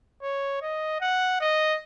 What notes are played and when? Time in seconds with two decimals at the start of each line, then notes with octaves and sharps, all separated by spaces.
0.22 C#5
0.62 D#5
1.01 F#5
1.41 D#5